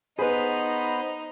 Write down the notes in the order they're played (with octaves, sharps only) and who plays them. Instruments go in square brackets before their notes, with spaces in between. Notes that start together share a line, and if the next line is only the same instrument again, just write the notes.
[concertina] B3 C5 B5 [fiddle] D#4 [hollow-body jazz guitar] G#4 B4